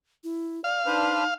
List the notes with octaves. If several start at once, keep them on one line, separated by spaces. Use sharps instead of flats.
E4
D5 F5
D4 D#4 B4 C5